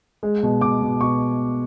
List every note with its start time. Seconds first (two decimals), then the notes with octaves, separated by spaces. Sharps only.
0.23 G#3
0.43 B2
0.61 B2 D6
0.82 B2
1.01 B2 C#6